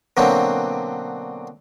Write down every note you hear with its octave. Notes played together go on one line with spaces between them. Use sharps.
B2 D3 F#3 A#3 C4